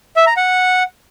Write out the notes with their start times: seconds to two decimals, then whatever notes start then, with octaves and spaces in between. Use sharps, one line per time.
0.17 E5
0.27 A#5
0.37 F#5